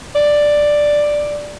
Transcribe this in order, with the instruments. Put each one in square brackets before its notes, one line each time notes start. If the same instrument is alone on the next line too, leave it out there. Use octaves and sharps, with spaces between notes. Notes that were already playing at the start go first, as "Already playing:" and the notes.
[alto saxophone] D5